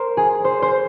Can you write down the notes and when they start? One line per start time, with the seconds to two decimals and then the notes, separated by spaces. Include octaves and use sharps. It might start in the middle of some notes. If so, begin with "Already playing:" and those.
Already playing: A#4 C5
0.17 G#4
0.45 C5
0.62 C5